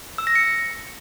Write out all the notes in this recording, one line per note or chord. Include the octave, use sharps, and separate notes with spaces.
E6
A#6
C#7